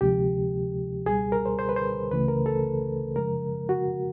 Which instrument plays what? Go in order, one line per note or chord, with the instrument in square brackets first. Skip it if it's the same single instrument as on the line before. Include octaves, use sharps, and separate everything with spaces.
[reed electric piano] D2 C3 F3 G#3 G4
C#2 B2 G3 G#4
A#4
C5
C5
B4
C5
C#2 C#3 E3 A3 B4
A#4
A4
F#2 C#3 F3 G#3 A#4
F#4